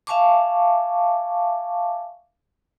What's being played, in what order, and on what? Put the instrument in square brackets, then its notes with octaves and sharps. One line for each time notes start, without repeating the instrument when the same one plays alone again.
[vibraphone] E5 F5 G#5 A5 C#6 D6